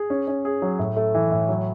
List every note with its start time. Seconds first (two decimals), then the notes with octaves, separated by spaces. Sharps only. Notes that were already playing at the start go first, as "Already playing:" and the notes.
Already playing: G#4
0.10 C#4
0.28 C#4
0.45 G#4
0.62 F#3
0.79 A2
0.96 A3
1.15 E3
1.32 A2
1.49 F#3